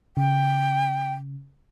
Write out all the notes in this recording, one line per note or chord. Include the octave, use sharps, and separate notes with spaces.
C#3 G5